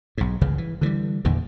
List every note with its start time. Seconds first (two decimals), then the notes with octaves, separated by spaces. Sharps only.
0.18 B1 G#2
0.41 G1 C#2 C#3 E3
0.58 E3
0.81 D3 E3 F#3 G3
1.25 E2 A#2 D3 D#3